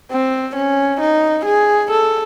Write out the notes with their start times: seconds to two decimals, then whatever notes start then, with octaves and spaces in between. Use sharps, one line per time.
0.11 C4
0.56 C#4
1.01 D#4
1.46 G#4
1.91 A4